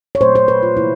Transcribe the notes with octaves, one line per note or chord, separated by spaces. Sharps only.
C#5
A#2 F#3 A3 C5
C5
B4
F4
C3 E3 G3 A#3 E4